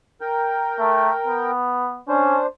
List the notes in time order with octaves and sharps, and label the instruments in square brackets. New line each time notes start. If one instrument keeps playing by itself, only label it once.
[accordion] A#4 G5
[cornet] A3
B3
[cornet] C#4 [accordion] D4 C5